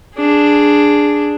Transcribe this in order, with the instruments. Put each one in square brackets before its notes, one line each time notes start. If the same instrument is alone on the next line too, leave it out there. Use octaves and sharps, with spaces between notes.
[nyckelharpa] D4 G#4